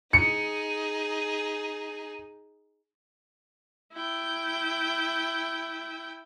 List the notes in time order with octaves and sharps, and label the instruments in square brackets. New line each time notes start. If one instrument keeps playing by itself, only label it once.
[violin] D#4 G#4 [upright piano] C#7
[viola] E4 G5